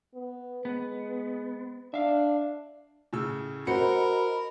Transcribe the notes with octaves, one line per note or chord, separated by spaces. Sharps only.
B3
G#3 B3
D4 E5 F5
A2 C#3 E6
F#4 A#4 C5 D#5 B5 C#7